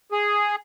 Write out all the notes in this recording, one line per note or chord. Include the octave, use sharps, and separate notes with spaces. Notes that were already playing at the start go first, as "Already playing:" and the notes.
G#4